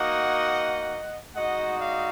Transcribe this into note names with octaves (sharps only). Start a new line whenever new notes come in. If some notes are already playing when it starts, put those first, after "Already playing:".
Already playing: A#3 D#4 F#4 D#5 F#5
G#3 D#4 F#4 D#5 F#5
D5 F5